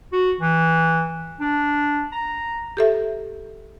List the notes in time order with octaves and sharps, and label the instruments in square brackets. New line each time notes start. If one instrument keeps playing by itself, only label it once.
[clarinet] F#4
E3
D4
A#5
[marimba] G4 A4 E5